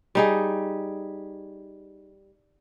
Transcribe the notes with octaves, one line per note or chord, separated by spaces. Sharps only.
G3 D#4 G#4